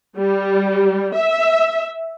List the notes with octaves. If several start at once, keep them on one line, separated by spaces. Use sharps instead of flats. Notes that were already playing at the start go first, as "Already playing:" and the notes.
G3
E5